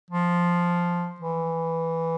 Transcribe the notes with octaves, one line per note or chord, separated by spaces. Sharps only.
F3
E3